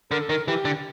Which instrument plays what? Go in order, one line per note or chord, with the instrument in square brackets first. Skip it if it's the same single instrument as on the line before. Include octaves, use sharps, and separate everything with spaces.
[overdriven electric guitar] D3 [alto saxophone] A#4
[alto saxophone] A4
[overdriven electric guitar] D#3 [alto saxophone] A#4
[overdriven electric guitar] E3 [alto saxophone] G4
[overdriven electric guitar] D3